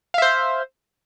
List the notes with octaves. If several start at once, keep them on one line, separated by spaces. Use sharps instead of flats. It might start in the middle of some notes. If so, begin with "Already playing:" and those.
C5 E5 F5